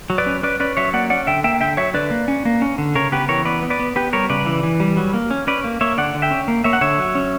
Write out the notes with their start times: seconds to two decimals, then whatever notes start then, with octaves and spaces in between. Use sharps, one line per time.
0.10 F#3
0.18 B4 D5
0.27 C#4
0.43 C#4 B4 D5
0.60 C#4 B4 D5
0.77 F#3 C#5 E5
0.93 A#3 D5 F#5
1.10 C#4 D5 F#5
1.27 D3 E5 G5
1.44 A#3 E5 G5
1.61 D3 E5 G5
1.77 F#3 C#5 E5
1.94 D3 B4 D5
2.11 A#3
2.28 C#4
2.45 A#3
2.62 C#4
2.78 D3
2.95 C#3 A#4 C#5
3.12 B3 G4 B4
3.29 E3 A#4 C#5
3.45 B3 B4 D5
3.63 B3
3.70 B4 D5
3.79 B3
3.96 B3 G4 B4
4.13 G3 A#4 C#5
4.30 C#3 B4 D5
4.46 E3
4.63 E3
4.80 G3
4.97 F#3
5.14 A#3
5.30 C#4
5.47 C#4 B4 D5
5.64 A#3
5.81 A#3 C#5 E5
5.97 D3 D5 F#5
6.14 D3
6.22 E5 G5
6.31 C#4
6.48 A#3
6.64 A#3 C#5 E5
6.73 F#5
6.81 D3 C#5 E5
6.98 F#3
7.15 C#4